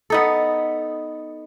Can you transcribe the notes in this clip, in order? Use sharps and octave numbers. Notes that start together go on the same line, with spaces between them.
B3 D#4 A4